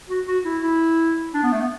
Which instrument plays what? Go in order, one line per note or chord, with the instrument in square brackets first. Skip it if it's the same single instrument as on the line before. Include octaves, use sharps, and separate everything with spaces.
[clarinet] F#4
F#4
E4
E4
D4
B3
A3
B3